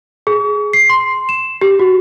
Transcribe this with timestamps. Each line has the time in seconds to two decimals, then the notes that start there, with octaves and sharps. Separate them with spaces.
0.27 G#4
0.73 C7
0.89 C6
1.29 E7
1.61 G4
1.79 F#4